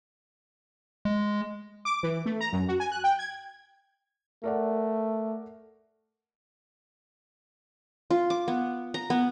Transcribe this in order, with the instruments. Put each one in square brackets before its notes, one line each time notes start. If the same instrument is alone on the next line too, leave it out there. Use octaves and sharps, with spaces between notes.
[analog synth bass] G#3
[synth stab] D6
E3
A3
A#5
F#2
F#4
G#5
F#6
G5
G#6
[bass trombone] A3 [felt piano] A#4 D5 F#5
[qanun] F4
D6
B3
A#5
B3